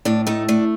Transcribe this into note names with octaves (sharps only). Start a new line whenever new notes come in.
A2 D4
A3 D#4
A3 D4